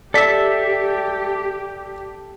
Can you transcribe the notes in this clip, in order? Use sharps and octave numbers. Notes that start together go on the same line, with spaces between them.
G4 A4 D5 E5 B6